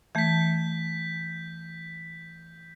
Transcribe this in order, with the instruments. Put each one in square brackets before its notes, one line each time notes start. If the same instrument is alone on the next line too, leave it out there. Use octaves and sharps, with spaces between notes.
[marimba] E3 A3 [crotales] G6 B6